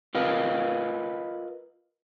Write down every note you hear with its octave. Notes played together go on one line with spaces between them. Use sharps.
F4 A#4 B4 D#5 F5